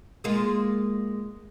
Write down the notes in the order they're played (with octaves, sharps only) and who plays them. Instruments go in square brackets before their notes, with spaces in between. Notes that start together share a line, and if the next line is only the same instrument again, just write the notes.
[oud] G#3 A#3 F4